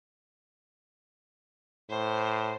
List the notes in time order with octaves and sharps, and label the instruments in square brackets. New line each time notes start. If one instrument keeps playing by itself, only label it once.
[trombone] A2 [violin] C5